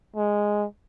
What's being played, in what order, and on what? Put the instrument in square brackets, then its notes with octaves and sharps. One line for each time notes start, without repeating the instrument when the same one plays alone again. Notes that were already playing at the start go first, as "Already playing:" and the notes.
[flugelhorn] G#3